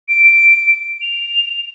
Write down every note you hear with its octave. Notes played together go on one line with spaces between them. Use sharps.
D7
F7